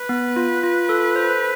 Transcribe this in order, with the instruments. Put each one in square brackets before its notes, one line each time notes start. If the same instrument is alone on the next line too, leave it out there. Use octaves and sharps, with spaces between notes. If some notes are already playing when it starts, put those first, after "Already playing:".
Already playing: [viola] B4
[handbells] B3
F4
F4
A4
C5